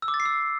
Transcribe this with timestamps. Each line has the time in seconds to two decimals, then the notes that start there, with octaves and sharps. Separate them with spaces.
0.02 E6
0.08 D6
0.14 A6
0.20 C7
0.25 E6